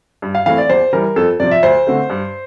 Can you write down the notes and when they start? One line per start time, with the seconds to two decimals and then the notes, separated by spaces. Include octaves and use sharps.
0.22 G2
0.35 F5
0.46 E3 A3 C4 F5
0.58 D5
0.69 E2 C5
0.93 E3 G3 A#4
1.16 F2 A4
1.40 C3 F3 D5
1.51 E5
1.63 D2 C5
1.87 D3 A3 C4
2.10 G2